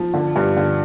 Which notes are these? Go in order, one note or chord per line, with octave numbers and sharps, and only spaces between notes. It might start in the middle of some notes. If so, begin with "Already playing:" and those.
Already playing: F3
D3
G2
D3